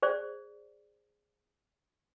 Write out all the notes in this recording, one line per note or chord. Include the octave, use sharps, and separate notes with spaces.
G#4 C5 D5